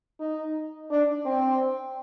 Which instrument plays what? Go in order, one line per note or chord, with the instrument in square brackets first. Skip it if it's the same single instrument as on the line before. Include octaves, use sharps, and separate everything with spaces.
[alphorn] D#4
D4
C4